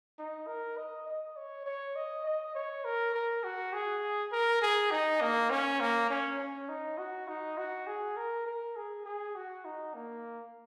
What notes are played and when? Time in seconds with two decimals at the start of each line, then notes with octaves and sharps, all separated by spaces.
0.18 D#4
0.47 A#4
0.77 D#5
1.08 D#5
1.36 C#5
1.66 C#5
1.96 D#5
2.25 D#5
2.55 C#5
2.85 A#4
3.14 A#4
3.44 F#4
3.73 G#4
4.32 A#4
4.62 G#4
4.91 D#4
5.21 A#3
5.50 C#4
5.80 A#3
6.10 C#4
6.39 C#4
6.69 D#4
6.98 F#4
7.28 D#4
7.58 F#4
7.87 G#4
8.17 A#4
8.47 A#4
8.76 G#4
9.06 G#4
9.35 F#4
9.65 D#4
9.94 A#3